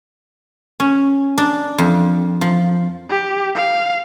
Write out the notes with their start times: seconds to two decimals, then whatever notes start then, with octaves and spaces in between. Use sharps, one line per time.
0.80 C#4
1.38 D4
1.78 F2
2.41 F3
3.10 G4
3.55 F5